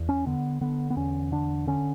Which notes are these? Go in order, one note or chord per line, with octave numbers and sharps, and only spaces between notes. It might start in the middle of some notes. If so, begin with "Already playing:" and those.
Already playing: E2
C#4
D3 B3
D3 B3
B3
E2 C#4
D3 D4
D3 C#4